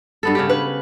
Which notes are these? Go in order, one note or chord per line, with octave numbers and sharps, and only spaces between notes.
G2 B3 A4
C#3 C#4 G4
B4